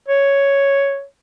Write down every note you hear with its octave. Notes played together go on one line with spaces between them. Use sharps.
C#5